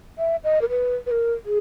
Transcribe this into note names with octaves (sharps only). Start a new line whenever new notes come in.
E5
D#5
A#4
B4
B4
A#4
G#4